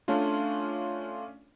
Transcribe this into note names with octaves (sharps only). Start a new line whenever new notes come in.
A3 C#4 D4 F4